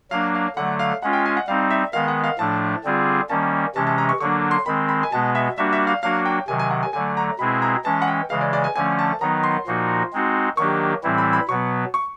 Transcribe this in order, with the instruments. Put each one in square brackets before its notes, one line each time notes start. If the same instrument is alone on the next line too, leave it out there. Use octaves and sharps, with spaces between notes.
[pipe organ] F#3 A#3 D4 [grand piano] F5
[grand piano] F5
[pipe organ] D3 F#3 A3 [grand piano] F#5
[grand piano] F5
[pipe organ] G#3 C#4 F4 [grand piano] F#5
[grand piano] G5
G#5
F#5
[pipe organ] G3 C4 D#4 [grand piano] F5
[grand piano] E5
[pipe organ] D#3 G#3 B3 [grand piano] F5
[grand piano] F#5
F5
[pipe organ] A2 F3 A3 D4 [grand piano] A5
[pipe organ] D3 G3 C4 F4 G#4
[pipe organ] D#3 G3 A#3 C#4 [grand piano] A5
[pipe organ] C3 E3 G#3 C#4 [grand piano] A5
[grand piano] A5
A#5
C#6
[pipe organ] D3 F#3 A#3 D4 [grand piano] C#6
[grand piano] C6
[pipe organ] D#3 G#3 C4 [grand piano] B5
[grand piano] B5
G#5
[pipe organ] B2 G#3 B3 [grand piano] A5
[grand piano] E5
[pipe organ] G3 A#3 D4 F#4 [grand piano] E5
[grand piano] E5
F5
[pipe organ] F#3 A#3 D4 F#4 [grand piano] F5
[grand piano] G5
[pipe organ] C3 D#3 F#3 [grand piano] G#5
[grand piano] G#5
F#5
G#5
[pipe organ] D3 F#3 A3 [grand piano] G#5
[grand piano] A#5
[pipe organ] B2 G#3 C4 E4 G#4 [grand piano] B5
[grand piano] A#5
[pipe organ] E3 G#3 C#4 [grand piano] A5
[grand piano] F#5
G5
[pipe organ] C#3 E3 G#3 [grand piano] F5
[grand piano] D5
D5
G#5
[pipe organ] D3 F3 A3 C#4 [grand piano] G#5
[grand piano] A5
[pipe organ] D#3 F#3 B3 D#4 [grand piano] A#5
[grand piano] C6
[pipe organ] A#2 F3 A#3 D#4 F#4
G#3 C4 D#4 F#4
[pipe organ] D#3 F#3 A#3 D4 G4 [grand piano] C#6
[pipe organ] A2 E3 G3 C4 E4
[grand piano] B5
B5
[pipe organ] B2 F#3 B3 [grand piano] C#6
[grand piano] C#6